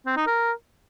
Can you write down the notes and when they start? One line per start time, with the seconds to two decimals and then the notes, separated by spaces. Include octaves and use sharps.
0.07 C4
0.17 D#4
0.27 A#4